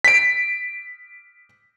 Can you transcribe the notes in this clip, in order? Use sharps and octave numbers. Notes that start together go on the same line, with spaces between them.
B6 D7